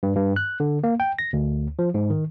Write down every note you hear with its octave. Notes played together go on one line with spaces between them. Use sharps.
G2
G2
F#6
D3
A#3
G5
A#6
D2
F3
G#2
D#3